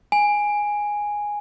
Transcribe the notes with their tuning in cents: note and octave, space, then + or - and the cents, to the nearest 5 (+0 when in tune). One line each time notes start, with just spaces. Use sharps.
G#5 -5